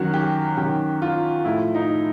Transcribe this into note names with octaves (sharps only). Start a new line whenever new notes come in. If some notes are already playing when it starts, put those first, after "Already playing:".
Already playing: F#2 D#3 F#3 F#4
G4
F#2 D#3 F#3 G4
F4
A2 F3 A3 E4
D#4